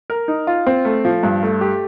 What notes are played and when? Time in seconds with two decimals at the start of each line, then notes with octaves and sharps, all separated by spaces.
0.10 A#4
0.28 D#4
0.47 F4
0.66 C4
0.85 A3
1.05 F3
1.23 G2
1.43 A3
1.61 G4